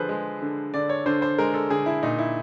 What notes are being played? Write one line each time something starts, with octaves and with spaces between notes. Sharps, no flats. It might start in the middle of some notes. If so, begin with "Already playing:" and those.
Already playing: D3 F3 G#4 A4 B4 C5
G#3
D3
D3 D5
C#5
D3 C5
C5
G#3 A#4
A4
D3 G#4
E4
A#2 D#4
E4